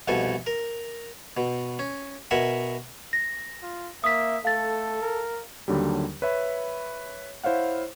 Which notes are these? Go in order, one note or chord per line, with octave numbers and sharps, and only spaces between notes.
C2 F2 B2 A4 G#5
A#4
B2
C#4
B2 A#4 E5 F#5 G#5
A#6
F4
A#3 E5 D#6 B6
A3 A4 F5 A6
A#4
D#2 D3 F#3 G3
B4 C#5 E5 B5
E4 C5 C#5 F5 F#5